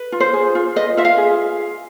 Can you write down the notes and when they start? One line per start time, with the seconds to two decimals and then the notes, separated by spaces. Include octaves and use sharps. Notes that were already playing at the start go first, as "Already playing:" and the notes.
Already playing: B4
0.12 F4
0.20 C5
0.33 G#4
0.55 F4
0.76 B4 D#5
0.97 F4 E5
1.05 F5
1.18 G#4